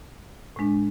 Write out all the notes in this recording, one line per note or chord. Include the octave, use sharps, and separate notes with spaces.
A2 G#3 D4